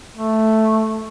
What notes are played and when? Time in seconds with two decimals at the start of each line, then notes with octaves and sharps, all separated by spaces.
0.16 A3